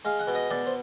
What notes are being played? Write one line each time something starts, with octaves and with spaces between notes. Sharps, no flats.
G#3 F5
F#5
B2
D#5
B2 D5
C5